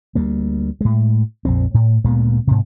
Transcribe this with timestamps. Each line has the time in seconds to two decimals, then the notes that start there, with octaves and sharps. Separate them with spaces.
0.15 D2 G3 A#3
0.81 A2 G#3
1.45 A#1 F2 C4
1.74 A2
2.04 D2 A#2 G#3 B3
2.47 G#2 C3